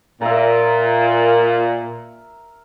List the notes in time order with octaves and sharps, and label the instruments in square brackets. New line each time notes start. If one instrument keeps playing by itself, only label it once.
[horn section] A#2 [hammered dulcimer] A#4 E5